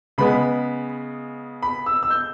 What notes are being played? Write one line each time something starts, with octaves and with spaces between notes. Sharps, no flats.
C#3 G#3 B3 B5
B5
E6
E6
G6